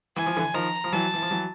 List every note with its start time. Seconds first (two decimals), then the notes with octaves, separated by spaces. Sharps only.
0.16 E3 G#5
0.26 F3
0.36 D3 E3
0.54 D#3 F3 A#5
0.84 F3
0.92 E3 F#3 A5
1.14 E3
1.22 F3
1.31 E3 F#3